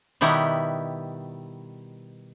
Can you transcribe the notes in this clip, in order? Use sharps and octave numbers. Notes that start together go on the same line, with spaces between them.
B2 D#3 G3 E4 F#5